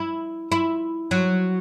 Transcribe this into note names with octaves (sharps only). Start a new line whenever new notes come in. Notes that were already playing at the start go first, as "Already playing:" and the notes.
Already playing: E4
E4
F#3